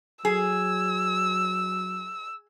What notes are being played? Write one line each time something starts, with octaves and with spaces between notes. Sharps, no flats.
F#3 G#4 E6